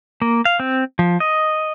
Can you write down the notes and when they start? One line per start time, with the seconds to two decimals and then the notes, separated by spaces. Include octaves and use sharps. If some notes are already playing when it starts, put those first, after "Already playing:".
0.22 A#3
0.45 F5
0.60 C4
0.99 F3
1.20 D#5